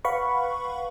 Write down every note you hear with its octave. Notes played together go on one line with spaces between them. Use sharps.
B4 F5 F#5 B5 C#6